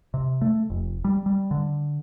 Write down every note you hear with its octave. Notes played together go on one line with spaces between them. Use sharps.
C3
A3
F1
G3
G3
D3